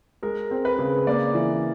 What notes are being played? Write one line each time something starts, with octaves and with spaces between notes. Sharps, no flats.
G#3 A#4
C4
B4
C#3
A#3 D5
E3